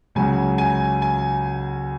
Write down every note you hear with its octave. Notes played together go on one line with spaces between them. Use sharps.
C#2 C#3 F#3 G#5
G#5
G#5